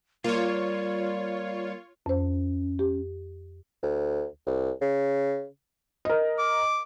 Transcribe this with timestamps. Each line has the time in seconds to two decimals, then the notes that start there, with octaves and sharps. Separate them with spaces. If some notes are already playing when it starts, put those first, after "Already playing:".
0.24 G3 A#3 F4 C#5
2.06 F2 C#4 C5
2.79 G4
3.83 D2
4.46 C2
4.81 C#3
6.05 A#4 D#5
6.39 D6